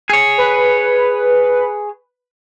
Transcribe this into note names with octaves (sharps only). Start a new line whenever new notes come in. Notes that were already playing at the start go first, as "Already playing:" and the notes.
G#4 C#5
B4